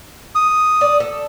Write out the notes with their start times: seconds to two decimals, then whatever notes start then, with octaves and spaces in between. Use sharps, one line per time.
0.35 D#6
0.81 D5
1.00 A4